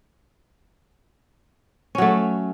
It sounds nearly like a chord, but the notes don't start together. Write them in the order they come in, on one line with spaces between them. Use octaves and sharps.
C#4 F#3 A3